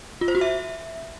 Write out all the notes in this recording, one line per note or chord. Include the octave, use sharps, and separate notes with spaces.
F4
C5
F#4
E5